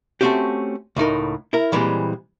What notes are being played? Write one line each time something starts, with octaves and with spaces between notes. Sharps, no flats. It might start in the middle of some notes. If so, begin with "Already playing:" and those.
A3 A#3 C4 C#4 F#4 G4
C#2 A2 D#4 A#4
E4 A#4
A#2 E3 G3 G#3 C4